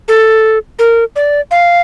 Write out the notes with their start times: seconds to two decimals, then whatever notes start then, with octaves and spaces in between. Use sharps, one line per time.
0.08 A4
0.79 A#4
1.16 D5
1.51 F5